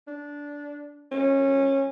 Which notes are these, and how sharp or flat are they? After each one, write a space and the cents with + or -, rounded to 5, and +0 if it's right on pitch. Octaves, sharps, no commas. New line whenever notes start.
D4 -15
C#4 -20